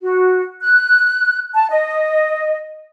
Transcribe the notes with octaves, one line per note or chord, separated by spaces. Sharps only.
F#4
F#6
A5
D#5